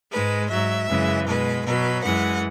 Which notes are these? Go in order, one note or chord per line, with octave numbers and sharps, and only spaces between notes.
G#2 G#3 B4
G#2 F#3 E5
F#2 C#3 E3 G#3
B2 G#3 B4
B2 F#3 B4
F#2 E3 G#3 F#5